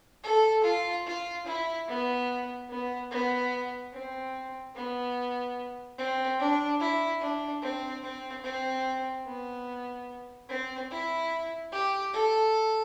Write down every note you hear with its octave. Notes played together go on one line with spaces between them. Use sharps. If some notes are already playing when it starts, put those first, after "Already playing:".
A4
F4
F4
E4
B3
B3
B3
C4
B3
C4
D4
E4
D4
C4
C4
C4
B3
C4
E4
G4
A4